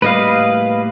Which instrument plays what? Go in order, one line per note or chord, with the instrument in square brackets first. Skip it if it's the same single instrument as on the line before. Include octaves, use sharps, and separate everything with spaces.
[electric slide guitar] A2 G3 A#3 [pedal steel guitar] B4 D#5 F5